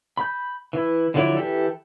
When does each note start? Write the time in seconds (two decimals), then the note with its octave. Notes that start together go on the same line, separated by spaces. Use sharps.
0.18 B5 G6
0.73 E3 E4
1.14 D3 F3 F#3 E4 D5
1.37 E3 G4 A4